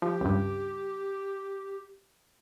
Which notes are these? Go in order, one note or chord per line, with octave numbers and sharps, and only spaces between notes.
F3 G4
C#2 G2